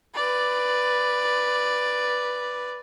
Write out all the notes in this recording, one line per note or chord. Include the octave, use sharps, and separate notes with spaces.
B4 D5